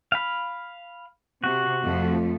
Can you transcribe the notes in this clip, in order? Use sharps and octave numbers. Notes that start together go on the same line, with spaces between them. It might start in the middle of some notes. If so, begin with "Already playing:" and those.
F5 B5
C3 F#4
F2 F3 A3